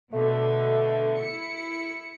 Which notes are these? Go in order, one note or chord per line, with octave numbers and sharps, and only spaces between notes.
B2 D3 A3
E4 C#7